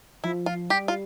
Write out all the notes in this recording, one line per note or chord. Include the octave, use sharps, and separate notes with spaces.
F3 E4
F4
G3 G4
F4